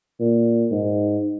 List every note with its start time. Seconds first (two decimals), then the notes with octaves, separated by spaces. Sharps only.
0.20 A#2
0.71 G#2